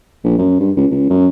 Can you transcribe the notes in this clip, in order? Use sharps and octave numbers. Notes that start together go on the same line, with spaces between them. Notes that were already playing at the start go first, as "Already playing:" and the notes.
A#1
F#2
G2
C#2
C#2
F#2